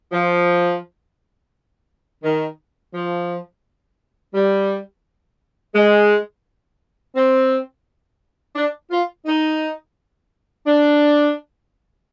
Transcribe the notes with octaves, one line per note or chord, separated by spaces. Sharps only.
F3
D#3
F3
G3
G#3
C4
D4
F4
D#4
D4